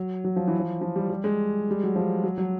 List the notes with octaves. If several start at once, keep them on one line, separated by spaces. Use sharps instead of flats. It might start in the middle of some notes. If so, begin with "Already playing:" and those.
Already playing: F#3
F#3
F3
E3
F3
F3
G3
G3
G#3
G3
F#3
F3
F#3
F#3